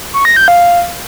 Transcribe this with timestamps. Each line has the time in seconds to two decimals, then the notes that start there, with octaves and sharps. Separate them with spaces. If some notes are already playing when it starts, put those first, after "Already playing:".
0.14 C#6
0.25 A#6
0.36 G6
0.48 F5